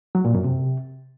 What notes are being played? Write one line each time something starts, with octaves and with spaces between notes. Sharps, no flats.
F#3
A#2
F#2
C3